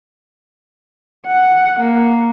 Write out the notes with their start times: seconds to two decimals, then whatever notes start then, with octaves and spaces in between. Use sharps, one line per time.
1.27 F#5
1.80 A#3